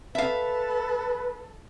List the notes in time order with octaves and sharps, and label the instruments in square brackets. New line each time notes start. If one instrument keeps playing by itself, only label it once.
[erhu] A4 [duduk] B4 [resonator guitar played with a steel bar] E5 F5